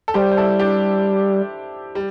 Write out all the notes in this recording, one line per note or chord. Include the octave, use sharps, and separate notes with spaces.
A4
G3 G4 C5
C5
E4 A4
D4 G4
G3